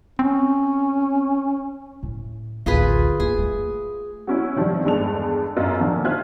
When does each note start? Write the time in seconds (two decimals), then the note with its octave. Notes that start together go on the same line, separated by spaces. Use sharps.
0.19 C4 C#4
2.03 A2
2.66 A1 D2 F4 G#4 B4
3.20 A#3 G#4
3.38 A3
4.27 F#3 C#4 E4
4.56 C3 D#3 F3 G3
4.85 E2 G2 G#3 A4 F7
5.57 F#2 F4 A#4 D#5 E6
5.80 A#2 D3 D#3 F3 A#3
6.05 F4 C5 E5 F6 F#6 G#6